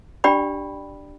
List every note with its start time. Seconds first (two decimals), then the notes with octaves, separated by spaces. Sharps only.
0.24 D4 G4 D5 G5 B5